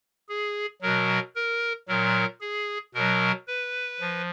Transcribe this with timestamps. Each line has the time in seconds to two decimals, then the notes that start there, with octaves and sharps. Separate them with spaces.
0.29 G#4
0.81 B2 F#3 A#4
1.35 A#4
1.88 A#2 F#3 A#4
2.41 G#4
2.94 B2 F#3 A#4
3.47 B4
4.00 F3